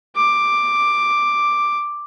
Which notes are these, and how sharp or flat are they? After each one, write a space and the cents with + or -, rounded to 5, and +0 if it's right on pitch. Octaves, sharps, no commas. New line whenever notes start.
D6 +5